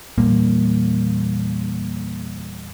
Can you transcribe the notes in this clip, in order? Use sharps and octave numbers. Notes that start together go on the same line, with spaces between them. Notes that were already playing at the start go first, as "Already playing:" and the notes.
E2 A#2 G3 A#3